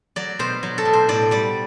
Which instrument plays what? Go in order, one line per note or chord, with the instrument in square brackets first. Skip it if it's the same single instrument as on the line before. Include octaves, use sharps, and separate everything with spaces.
[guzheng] F#3 D5
B2 C5
F#3
A4
B2
C5
A2 D5
G3 D5